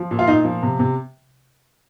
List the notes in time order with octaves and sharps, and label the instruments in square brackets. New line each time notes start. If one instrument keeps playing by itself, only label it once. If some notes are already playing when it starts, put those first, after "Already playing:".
Already playing: [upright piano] F3
A#2
F4
A#2 D#4
F3
C3
C3